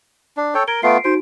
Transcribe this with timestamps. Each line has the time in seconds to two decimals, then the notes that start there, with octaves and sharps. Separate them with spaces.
0.37 D4
0.55 A4 C#5 G5
0.68 A#4 G#6 D7 G7
0.83 A3 B3 F4 C7 D7
1.04 D#4 F#4 C5 D7